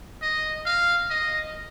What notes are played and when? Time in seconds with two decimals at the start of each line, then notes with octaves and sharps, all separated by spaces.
0.22 D#5
0.66 F5
1.10 D#5